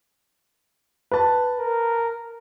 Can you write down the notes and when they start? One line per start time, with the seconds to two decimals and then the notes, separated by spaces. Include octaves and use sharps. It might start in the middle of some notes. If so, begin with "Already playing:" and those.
1.12 B4 A5
1.59 A#4